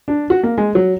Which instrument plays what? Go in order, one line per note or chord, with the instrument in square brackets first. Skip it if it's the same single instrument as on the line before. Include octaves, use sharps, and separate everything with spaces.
[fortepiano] D4
F#4
A#3
G#3
F#3